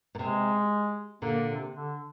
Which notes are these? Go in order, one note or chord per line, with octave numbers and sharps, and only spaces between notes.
A#2
C3 G#3
A#2 D3 A#3
C3
D3